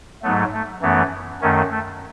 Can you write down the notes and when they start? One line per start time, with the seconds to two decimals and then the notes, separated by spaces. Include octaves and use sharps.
0.22 G#2 F#3 A3 B3
0.53 A3
0.82 F#2 E3 A3 B3
1.41 F#2 D#3 A3 C#4
1.70 A3